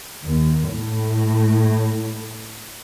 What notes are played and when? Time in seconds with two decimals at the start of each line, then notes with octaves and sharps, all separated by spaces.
0.24 D#2
0.74 A2